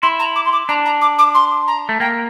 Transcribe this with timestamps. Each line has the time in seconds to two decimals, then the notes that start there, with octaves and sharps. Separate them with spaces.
0.02 E4 C6
0.19 A#5
0.36 D6
0.45 C6
0.52 D6
0.69 D4 A#5
0.85 A#5
1.01 D6
1.18 D6
1.34 C6
1.68 A#5
1.89 A3
2.00 A#3 G5